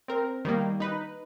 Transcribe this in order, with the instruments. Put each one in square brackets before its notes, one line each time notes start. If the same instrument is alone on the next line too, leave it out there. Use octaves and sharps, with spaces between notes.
[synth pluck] C4 A#4
D#3 G3 A#3
D#4 B4